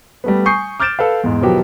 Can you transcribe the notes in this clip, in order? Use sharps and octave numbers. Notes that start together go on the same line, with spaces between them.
G3 A3 B3
G#5 C#6 D#6 G6 C7
D6 F6 G6 A6 D7 E7
A4 B4 F5
E2 G#2
B2 D#3 F3 F#3 B3 G4